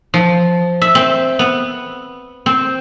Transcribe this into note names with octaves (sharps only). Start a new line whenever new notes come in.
F3
E5
C4
B3
C4